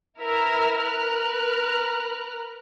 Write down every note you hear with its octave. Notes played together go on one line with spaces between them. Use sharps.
E4 A#4 B4 E5 F6
A#4 B4 F6 F#6